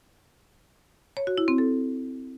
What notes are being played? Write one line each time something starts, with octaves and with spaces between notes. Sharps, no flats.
C#5
F#4
E4
C4
A4